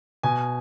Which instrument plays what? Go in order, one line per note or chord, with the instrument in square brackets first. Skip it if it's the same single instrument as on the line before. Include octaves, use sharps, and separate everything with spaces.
[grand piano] B2 G#5